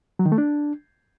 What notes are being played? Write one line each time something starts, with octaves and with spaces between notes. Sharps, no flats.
F#3
D#3
A3
D4